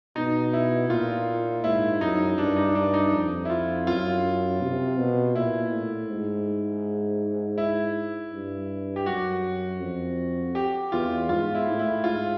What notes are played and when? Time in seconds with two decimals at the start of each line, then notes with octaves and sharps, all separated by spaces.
0.16 B2 D#4
0.53 E4
0.89 A#2 F4
1.64 G#2 E4
2.01 F#2 D#4
2.38 G2 D4
2.56 D#4
2.75 G2 D4
2.94 D#4
3.12 F2
3.45 E4
3.50 F4
3.86 F#2 F4
4.62 C3
4.98 B2
5.35 A#2 E4
5.72 A2
6.09 G#2
7.58 E4
8.33 G2
8.96 G4
9.06 F#2 F#4
9.81 F2
10.55 G4
10.92 E2 F4
11.29 G#2 F4
11.55 E4
11.66 A2
11.79 E4
12.03 G#2 F4